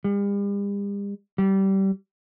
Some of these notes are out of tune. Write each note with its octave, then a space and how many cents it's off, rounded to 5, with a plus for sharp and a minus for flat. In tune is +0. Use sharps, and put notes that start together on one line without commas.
G3 +45
G3 -20